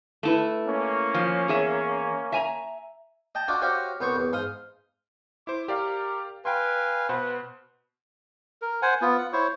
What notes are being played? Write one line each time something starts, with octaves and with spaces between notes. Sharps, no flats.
A3 E4 B4
A#3 C#4
F3
E2 G#4 E5
E5 G#5 A#5
D#5 G5 A5
D4 F4 F#4 D5 D#5
F#4 G4 C5 C#5 D#5 F5
C2 B3 C5 C#5 C#6
E2
G#2 F5 C6 D#6
E4 C5 D6
G4 A#4 D5 F5
B4 F5 G5 G#5 C6
B2 B4 C5 F#5
A#4
C5 F#5 G#5
B3 F4
F#5
E4 C5 C#5 C#6